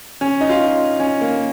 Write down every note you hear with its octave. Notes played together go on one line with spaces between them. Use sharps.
C#4
D#4
F4
C#4
A#3